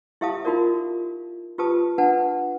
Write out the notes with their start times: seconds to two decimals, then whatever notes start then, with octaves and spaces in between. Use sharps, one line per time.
0.21 E4 G4 E5 F5 A5 D#6
0.45 D#4 F4 F#4 A#4 D5
1.58 F4 G4 B4 A5 D#6
1.98 D4 B4 F#5 A5